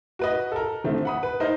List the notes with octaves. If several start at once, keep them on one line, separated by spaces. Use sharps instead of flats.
F#4 B4 D#5
A4 A#4
D3 D#3 F3 A3 C4
F#5 B5 D#6
B4
D#4 A#4 C5 D#5